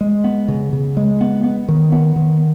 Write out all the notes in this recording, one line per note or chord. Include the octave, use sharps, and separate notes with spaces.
G#3
B3
C#3
C#3
G#3
B3
B3
D#3
B3
D#3